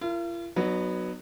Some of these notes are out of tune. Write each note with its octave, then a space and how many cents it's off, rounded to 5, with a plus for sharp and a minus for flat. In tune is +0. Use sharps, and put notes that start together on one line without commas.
F4 -45 A#4 -10
F#3 +0 B3 +0 D#4 -40